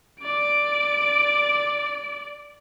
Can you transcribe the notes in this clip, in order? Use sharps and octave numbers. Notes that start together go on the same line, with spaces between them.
D5 D7